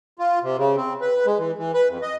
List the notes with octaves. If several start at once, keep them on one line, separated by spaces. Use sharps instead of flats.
F4
C3
C#3
C4
B4
G#3
E3
E3
B4
F2
D#5